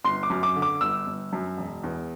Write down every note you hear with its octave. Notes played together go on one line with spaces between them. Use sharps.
G1 C6
D6
F#2
D6
D3
D6
G1 E6
G1
F#2
E1
E2